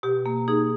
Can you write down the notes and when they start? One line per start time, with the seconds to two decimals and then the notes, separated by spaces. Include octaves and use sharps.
0.03 B2 G4
0.26 A#3
0.48 D#4 G#4